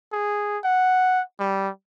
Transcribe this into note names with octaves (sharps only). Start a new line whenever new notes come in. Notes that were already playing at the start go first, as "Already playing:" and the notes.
G#4
F#5
G3